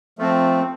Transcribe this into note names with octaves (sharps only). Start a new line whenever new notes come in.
F3 A3 C4